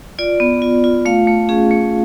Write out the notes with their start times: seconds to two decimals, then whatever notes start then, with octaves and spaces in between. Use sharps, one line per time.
0.19 F4 D5
0.40 B3
0.62 F4
0.84 F4
1.05 A3 F5
1.27 A3
1.49 C#4 G#4
1.71 A3